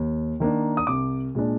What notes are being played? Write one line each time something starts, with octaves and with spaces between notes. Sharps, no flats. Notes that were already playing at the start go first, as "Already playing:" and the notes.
Already playing: D#2
D#3 A#3 D4
D#6
C2 D6
A#2 G#3 D4